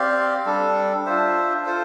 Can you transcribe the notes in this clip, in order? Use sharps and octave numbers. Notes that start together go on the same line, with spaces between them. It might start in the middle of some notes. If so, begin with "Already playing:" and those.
Already playing: C4 G4 D5 F5
G3 D4 A4
D4 F4 C5 E5
F4 A4 C5